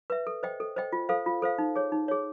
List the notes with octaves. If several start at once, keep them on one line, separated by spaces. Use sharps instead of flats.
B4 E5
A4
C5 D#5 G5
A4
C5 D#5 G5
F4
A4 C5 F5
F4
A4 C5 F5
D#4
G#4 C#5
D#4
G#4 C#5